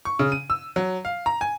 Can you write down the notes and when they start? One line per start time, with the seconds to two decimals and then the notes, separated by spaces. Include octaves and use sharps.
0.05 C#6
0.19 C#3
0.32 D#7
0.50 E6
0.76 F#3
1.05 F5
1.26 A#5
1.41 G#5